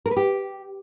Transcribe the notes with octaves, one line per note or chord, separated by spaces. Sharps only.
A#4
B4
G4